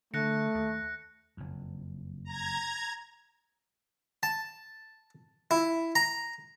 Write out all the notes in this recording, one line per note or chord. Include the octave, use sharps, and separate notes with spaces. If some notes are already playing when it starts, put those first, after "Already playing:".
D3 A3 F#6 A#6 C#7
D#2
F#1 F2
A#5 G#6
A5
E4
A#5